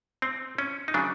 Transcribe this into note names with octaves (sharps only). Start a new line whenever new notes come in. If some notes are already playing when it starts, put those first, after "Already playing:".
C4
C#4
D#4
C#3 F#3 D4